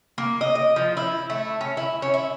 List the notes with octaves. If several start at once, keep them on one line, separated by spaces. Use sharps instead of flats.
A#3
D#5
D#5
F3
E4
A3
C#4
E4
C#4
E4